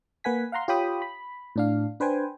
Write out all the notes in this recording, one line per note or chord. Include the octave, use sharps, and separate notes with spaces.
A#3 B4 F#5 G#5 B6
F5 F#5 A#5 C6
F4 G4 C#5 G5 B5 D#6
B5
A2 D4 F5
D4 B4 C5 G5 G#5